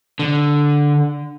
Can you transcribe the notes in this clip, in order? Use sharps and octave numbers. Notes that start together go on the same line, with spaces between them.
D3